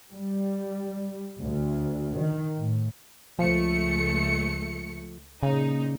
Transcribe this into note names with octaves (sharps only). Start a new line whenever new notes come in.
G3
D2
D#3
A2
C#2 F3 A3 C#7
A#2 C#3 D#4